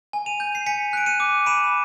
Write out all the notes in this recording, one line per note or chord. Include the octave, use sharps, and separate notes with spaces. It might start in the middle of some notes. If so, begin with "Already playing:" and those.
G#5
D#7 F7
G6
C7
G#5 B6 C#7
F#6 D7
C#7 D#7
D6
B5 D7 E7